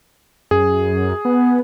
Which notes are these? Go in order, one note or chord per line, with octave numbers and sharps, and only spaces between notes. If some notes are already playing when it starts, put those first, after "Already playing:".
F#2 G#4
B3